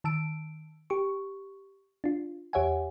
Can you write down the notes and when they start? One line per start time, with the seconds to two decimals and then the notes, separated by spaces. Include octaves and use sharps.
0.04 D#3 A5 E6 D7
0.90 G4 C#6
2.04 D4 F4
2.53 E2 G4 C#5 E5 F#5 G#5